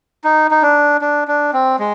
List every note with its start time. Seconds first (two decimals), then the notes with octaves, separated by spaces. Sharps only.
0.24 D#4
0.51 D#4
0.62 D4
1.01 D4
1.28 D4
1.53 C4
1.79 G#3